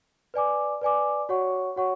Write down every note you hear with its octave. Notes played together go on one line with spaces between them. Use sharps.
B4 D5 G#5 D6
B4 D5 G#5 D6
F#4 C#5 F#5 C#6
F#4 C#5 F#5 C#6